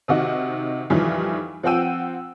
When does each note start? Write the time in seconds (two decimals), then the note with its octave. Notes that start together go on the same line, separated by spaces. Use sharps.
0.08 C3 D#3 F#4 D#5
0.90 F2 A#2 D#3 E3 G3
1.63 F3 C4 F#5 G5 E6 D#7